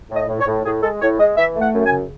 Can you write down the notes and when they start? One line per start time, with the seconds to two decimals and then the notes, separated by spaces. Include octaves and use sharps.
0.10 A2
0.16 D#5
0.28 A2
0.41 C#5
0.47 A2
0.65 A2 G#4
0.83 G#3 A4
1.02 A2 C#5
1.19 G#3 D#5
1.37 E3 E5
1.56 A3
1.61 F#5
1.74 F#2
1.86 G#5
1.92 C#3